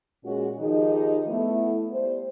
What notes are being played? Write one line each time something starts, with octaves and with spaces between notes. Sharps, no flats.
A#2 G#3 C#4 F#4
D#3 F3 D#4 G4 G#4 D#5
A3 B3 E4
G3 C5